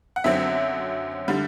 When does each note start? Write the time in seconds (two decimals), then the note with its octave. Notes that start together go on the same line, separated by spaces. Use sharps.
0.16 F#5
0.24 F#2 D3 F#3 C4 E5
1.28 D3 G3